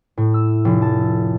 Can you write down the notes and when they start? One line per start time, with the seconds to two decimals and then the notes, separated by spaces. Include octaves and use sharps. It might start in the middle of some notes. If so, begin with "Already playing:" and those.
0.18 A2
0.34 E6
0.65 F1
0.82 A5